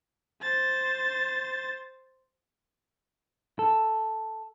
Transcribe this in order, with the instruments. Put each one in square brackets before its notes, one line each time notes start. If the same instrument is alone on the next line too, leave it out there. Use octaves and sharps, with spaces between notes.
[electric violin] C5 A6
[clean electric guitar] A4